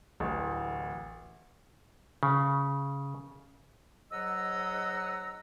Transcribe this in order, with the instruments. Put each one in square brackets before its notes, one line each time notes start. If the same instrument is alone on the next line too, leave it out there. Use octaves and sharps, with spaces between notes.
[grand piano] D1 A1
[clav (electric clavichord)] C#3
[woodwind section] G#2 F#3 D#5 F#5 A#5 E6